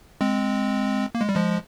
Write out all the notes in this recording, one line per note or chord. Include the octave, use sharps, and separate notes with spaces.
G#3 C4
A#3
G#3
G3
F3 G#3